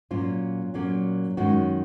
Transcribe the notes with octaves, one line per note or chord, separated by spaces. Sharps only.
A#2 F#3 A#3 C#4 F4
A#2 F#3 A#3 C#4
F#2 D#3 G#3 C#4 F#4